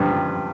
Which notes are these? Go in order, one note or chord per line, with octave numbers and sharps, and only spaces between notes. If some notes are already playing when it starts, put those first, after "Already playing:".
Already playing: G2 F3